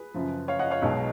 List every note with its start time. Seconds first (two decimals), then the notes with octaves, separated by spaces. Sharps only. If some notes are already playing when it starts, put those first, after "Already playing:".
Already playing: G#4 B4
0.14 F#2 C#3 F3
0.48 C#5 F5
0.59 D#5 F#5
0.70 C#5 F5
0.82 B1 B2 G#3 D#4